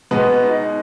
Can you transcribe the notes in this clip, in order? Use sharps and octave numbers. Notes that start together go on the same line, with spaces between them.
B2 G#3 B3
D#4